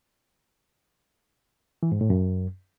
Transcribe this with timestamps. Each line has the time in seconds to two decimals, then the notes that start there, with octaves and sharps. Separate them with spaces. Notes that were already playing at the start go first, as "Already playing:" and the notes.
1.83 E3
1.92 G#2
2.01 A2
2.10 F#2